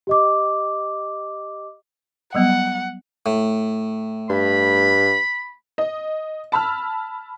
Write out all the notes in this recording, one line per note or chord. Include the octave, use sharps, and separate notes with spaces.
G4 D#5 D6
F#3 G3 B3 F#5
A2
G2 B5
D#5
A5 B5 E6 F6